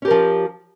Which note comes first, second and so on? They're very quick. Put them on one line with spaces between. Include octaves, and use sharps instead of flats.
C#4 G4 A#4 F3